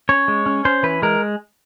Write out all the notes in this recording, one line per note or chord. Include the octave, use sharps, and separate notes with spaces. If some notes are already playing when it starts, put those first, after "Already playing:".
C#4 C#5
G#3
C#4
C#4 C5
E3 B4
G#3 A#4